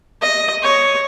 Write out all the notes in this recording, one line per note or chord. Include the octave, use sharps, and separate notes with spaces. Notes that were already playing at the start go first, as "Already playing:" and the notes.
D#5
C#5